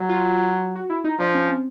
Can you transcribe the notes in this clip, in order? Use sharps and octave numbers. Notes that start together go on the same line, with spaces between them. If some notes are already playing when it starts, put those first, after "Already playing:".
Already playing: F#3
F4
F#4
E4
D#4
F3 D4
C#4
C4